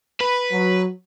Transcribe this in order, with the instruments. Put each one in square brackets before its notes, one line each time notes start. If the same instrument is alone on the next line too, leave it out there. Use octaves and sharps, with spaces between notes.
[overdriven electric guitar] B4
[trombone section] F#3